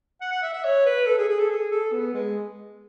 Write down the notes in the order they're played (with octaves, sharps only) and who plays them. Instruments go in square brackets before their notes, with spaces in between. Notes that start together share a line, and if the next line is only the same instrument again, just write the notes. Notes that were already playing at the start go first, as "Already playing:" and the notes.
[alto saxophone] F#5
F#5
E5
E5
C#5
B4
A4
G#4
G#4
A4
G#4
A4
B3
G#3